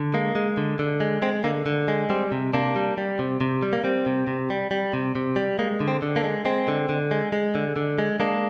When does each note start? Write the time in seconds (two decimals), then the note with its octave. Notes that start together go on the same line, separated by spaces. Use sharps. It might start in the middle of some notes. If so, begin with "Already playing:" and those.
Already playing: D3
0.14 G#3 A#3
0.35 G#3
0.57 D3
0.79 D3
1.00 G#3
1.22 G#3 C4
1.44 D3 A#3
1.66 D3
1.88 G#3
2.10 G3 C4
2.32 C3
2.53 C3 A#3 D4
2.76 G3
2.98 G3
3.19 C3
3.41 C3
3.62 G3
3.73 A#3
3.84 G3 C4
4.06 C3
4.27 C3
4.50 G3
4.71 G3
4.93 C3
5.15 C3
5.36 G3
5.59 G#3 A#3
5.80 D3
5.88 C4
6.02 D3
6.16 A#3 D4
6.24 G#3
6.45 G#3 C4
6.68 D3
6.89 D3
7.11 G#3
7.32 G#3
7.55 D3
7.76 D3
7.98 G#3
8.20 G#3 A#3 D4